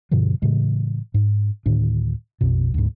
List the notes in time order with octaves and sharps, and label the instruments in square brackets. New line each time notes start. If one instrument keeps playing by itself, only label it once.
[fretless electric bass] G2 B2 D3 F3
A2 C#3 E3 G#3
G#2
D2 A2 D#3 D4
A#1 F2 B2
D2 G#2